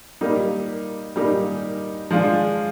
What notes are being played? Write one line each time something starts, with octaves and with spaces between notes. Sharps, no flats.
G3 A#3 D#4 G4
G3 A#3 D#4 G4
F3 G#3 D4 F4